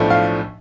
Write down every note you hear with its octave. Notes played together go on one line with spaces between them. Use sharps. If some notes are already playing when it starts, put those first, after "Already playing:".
Already playing: B1 A2 F3 A3 D4
F5